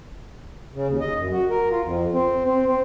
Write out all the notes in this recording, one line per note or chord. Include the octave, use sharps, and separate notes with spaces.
C#3
D#2
D#5
F#2
F#4
A#4
F4
F2
C4
C4
C4